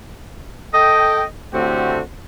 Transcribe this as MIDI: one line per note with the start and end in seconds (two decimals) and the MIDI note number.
0.74 1.24 69
0.74 1.24 75
0.74 1.24 79
1.54 2.00 45
1.54 2.00 50
1.54 2.00 57
1.54 2.00 60
1.54 2.00 66
1.54 2.00 67